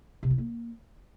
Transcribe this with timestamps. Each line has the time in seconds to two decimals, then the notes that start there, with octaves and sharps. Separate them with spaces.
0.23 C3
0.30 E4
0.38 A#3